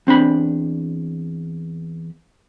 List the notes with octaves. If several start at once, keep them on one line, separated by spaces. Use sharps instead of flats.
E2 C4 D4 B5